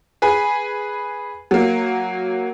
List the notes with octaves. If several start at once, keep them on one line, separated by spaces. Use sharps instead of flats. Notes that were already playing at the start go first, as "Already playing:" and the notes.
G#4 B4 G#5
F#3 A#3